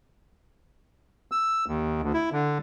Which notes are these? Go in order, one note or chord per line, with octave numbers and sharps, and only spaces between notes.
E6
D#2
D2
E4
D3